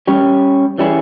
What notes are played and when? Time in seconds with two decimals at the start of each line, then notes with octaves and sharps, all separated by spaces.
0.07 G3 C#4 G4 C#5
0.78 E3 G3 C#4 E4 G#4